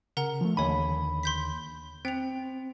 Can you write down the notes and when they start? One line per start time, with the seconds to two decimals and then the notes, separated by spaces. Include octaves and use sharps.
0.17 C#3 A#4 F#5 A#5
0.41 F3 A3
0.57 D#2 D3 C#5 G#5 B5
1.23 C6 G6 B6
2.05 C4 G5 F7